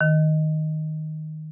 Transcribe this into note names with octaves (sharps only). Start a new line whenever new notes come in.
D#3